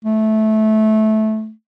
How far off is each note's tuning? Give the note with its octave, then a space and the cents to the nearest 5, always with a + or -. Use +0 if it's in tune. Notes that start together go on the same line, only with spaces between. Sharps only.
A3 -15